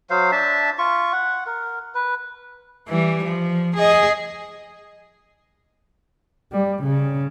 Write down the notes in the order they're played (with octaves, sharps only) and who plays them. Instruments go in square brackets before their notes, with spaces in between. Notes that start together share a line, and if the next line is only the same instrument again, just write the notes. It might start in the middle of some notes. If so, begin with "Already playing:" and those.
[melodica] F#3 C5 F5
D4 E5 A5
F4 C#6
F#5
A#4
B4
[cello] E3 G3
F3
G#4 D#5
[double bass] G3
C#3